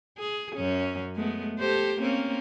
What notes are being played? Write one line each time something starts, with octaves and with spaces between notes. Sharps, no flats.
G#4
F#2 C#4
G#3 A3 B3
G4 A4 C5
A#3 C4 C#4